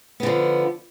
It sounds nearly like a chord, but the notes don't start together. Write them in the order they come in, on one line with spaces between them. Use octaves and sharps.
B3 D3 F3